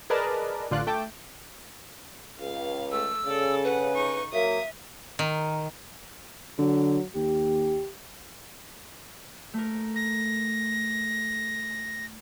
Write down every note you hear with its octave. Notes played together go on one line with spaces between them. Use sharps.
G#4 A#4 B4 D5 D#5 A5
A1 D3 F4 D5 F#6
A3 G5 A5 D6
C#2 F5
A3 E6
C#3 A4 D5
B4 F#5
D#4 C#6
F#3 A#3 E5 D#6
D#3
D3 F#3
D#2 G4
A3 A#4
A#6